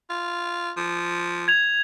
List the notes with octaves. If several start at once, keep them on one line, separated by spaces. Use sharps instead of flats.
F4
F3
G#6 F7